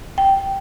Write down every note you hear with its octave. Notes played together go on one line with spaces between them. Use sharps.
G5